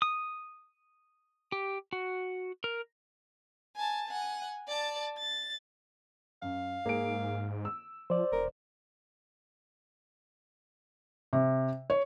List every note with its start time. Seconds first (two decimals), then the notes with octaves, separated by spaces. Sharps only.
0.02 D#6
1.52 G4
1.93 F#4
2.64 A#4
3.76 G#5 A5
4.08 F#5 G#5
4.68 D5 A5
5.18 A6
6.42 F#2 F5
6.86 G#2 A#3 G#4 D7
7.65 E6
8.10 F3 C5 D5
8.32 E1 A#4
11.33 C3
11.90 C#5